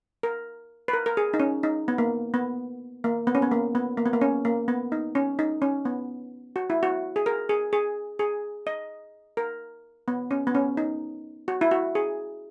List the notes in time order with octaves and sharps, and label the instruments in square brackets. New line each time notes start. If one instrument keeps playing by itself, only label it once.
[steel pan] A#4
B4
A#4
A#4
G#4
D#4
C#4
D#4
B3
A#3
B3
A#3
B3
C#4
B3
A#3
B3
A#3
B3
A#3
C#4
A#3
B3
D#4
C#4
D#4
C#4
B3
F#4
E4
F#4
G#4
A#4
G#4
G#4
G#4
D#5
A#4
B3
C#4
B3
C#4
D#4
F#4
E4
F#4
G#4